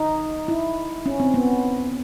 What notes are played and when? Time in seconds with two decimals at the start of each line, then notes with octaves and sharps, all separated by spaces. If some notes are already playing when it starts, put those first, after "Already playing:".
Already playing: D#4
0.48 E4
1.06 C#4
1.20 C4
1.34 B3